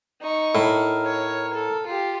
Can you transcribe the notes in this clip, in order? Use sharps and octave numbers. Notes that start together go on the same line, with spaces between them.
D#4 C#6
A2 A#4
C#5
A4
F4 G4